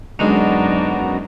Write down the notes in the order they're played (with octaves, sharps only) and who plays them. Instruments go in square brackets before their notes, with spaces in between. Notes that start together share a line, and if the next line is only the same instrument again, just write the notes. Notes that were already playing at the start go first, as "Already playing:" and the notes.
[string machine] F#2 [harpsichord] D3 G#3 [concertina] B3 F#4 A#5 [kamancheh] D4 D#4